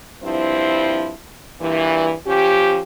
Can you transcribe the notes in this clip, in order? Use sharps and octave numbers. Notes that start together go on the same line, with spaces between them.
G2 F3 C4 E4
G2 A#2 E3
F3 C#4 G4